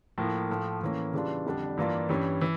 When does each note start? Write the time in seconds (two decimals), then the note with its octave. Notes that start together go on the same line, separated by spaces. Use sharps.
0.18 A2 F3 A#3
0.49 A2 F3 A3
0.81 A2 E3 A#3 C#4
1.13 C#3 E3 G3 D4 F4
1.46 F2 D3 G3 D4
1.77 G2 E3 A#3 D4 F4
2.09 G2 E3 G3 C#4
2.41 E3